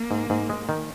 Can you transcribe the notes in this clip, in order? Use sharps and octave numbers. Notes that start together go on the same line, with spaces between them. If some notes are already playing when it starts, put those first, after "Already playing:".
Already playing: A#3
G#2
G#2
G#3
D#3